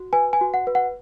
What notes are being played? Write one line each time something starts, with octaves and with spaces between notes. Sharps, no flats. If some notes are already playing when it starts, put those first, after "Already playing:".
Already playing: F#4
B4 G#5
G#5
F#4
F#5
B4
F#5